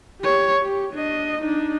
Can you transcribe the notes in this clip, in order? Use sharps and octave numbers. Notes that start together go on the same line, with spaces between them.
G4 C#5
G4
D4 D#5
D4 D#4